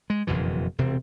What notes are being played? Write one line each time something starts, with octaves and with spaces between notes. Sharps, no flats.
G#3
F#1 F2 B2 E3
E1 C3 C4